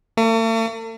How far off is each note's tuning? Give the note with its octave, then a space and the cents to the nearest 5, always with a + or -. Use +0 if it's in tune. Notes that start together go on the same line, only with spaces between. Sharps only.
A3 +45